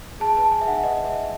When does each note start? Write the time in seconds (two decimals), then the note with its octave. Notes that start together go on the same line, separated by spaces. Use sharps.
0.20 G#4 A5
0.36 B4 A5
0.52 G#4 G#5
0.61 E5
0.68 D#4 F#5
0.83 B4 D#5
0.97 B4 D#5
1.05 E5
1.15 D#4